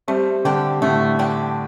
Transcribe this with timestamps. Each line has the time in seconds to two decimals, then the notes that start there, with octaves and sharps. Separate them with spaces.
0.08 G3 A3 C4
0.45 D3 G3 D4 G4
0.82 A2 D3 A3
1.19 D4 G4